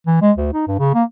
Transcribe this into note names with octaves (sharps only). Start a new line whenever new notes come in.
E3
G#3
D2
D#4
G2
C#3
A#3